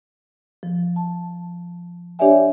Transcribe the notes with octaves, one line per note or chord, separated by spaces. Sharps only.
F3
A5
D4 G4 C#5 D5 E5 G#5